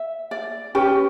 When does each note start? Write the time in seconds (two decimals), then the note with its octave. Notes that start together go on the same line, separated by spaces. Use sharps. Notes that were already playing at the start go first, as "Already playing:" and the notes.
Already playing: E5
0.31 D5
0.75 C#4 G4 B4